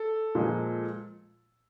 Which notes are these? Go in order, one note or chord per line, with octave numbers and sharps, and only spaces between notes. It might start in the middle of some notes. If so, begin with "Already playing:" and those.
Already playing: A4
A#2 F3 G#3